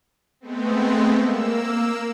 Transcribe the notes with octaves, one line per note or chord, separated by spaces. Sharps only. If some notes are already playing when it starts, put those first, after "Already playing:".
G#3 A3 B3 C4
A#3 E6